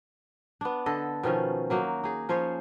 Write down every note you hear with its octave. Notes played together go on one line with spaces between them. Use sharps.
B3 D4
D3 A4 D#5
B2 D#3 F3 C#4
F#3 A#3 D#4 F#4
D#4 G#4
F3 C#4 C5 C#5